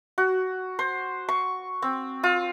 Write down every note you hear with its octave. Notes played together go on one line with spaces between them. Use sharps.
F#4
C5
C#6
C4
F4